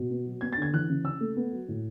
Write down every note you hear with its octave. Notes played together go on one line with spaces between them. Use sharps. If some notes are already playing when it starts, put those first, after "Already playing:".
Already playing: B2
B3
F#3
B3 G#6
A6
D3 G#6
E3 F#6
C#3
C#3 E6
A3
B3
F#3
A2